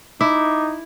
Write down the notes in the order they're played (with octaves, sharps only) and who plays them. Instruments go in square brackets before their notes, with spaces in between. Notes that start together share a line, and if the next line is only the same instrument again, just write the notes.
[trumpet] D#4 [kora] E4 [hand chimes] D6